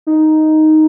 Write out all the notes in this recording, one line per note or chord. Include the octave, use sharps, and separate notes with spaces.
D#4